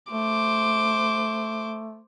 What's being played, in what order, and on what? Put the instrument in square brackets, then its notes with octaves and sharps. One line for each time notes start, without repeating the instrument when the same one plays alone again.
[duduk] A3 [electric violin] C5 D6